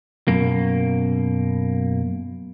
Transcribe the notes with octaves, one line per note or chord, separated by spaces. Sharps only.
F#2 B2 A#3